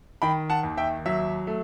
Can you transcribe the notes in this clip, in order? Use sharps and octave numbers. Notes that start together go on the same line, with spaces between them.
D#3 G5 B5
F#5 A5
D#2
E5 G5
F#3 E5
A3